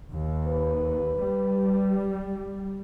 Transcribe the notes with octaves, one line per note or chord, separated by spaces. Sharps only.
D#2
B4
G3